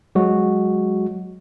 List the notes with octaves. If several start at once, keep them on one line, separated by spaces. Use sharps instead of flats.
F#3 G#3 F#4